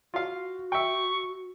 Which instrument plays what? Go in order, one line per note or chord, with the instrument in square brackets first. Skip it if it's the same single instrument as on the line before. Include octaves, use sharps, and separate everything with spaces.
[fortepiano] F4 F5 [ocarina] F#4
[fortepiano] E5 G5 [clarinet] C#6